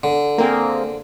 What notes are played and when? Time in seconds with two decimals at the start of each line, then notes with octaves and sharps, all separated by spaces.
0.03 D3
0.38 A#3 C4 G#4